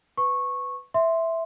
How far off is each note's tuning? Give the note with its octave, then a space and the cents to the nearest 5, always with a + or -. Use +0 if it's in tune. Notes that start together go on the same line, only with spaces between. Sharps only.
B4 +15 C#6 -15
E5 +0 C6 +0